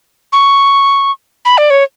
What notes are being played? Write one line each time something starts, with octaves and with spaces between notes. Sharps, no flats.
C#6
B5
D5
C#5